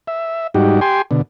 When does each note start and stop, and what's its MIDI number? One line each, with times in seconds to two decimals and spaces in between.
0.07 0.47 76
0.54 0.80 44
0.54 0.80 55
0.54 0.80 63
0.54 0.80 66
0.54 0.80 67
0.81 1.02 67
0.81 1.02 79
0.81 1.02 80
0.81 1.02 84
1.11 1.22 47
1.11 1.22 50